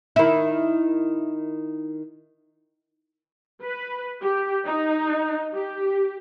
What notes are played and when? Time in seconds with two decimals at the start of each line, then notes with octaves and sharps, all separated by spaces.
0.16 D#3 E4
3.63 B4
4.22 G4
4.66 D#4
5.54 G4